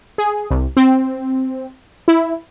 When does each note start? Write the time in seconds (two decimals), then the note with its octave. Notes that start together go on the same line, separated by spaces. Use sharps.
0.18 G#4
0.50 C2
0.77 C4
2.08 E4